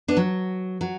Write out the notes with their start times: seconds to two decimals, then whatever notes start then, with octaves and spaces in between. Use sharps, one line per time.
0.08 B3 D4
0.17 F#3
0.81 F#3